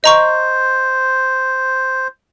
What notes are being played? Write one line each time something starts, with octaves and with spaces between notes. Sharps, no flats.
C5 D#5 A#5 C#6